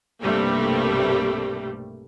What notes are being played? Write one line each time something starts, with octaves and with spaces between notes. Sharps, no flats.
B1 G2 C3 G3 A3 A#3